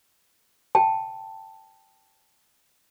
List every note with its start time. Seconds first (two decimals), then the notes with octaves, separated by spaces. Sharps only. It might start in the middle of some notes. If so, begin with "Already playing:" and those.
0.75 G5 A5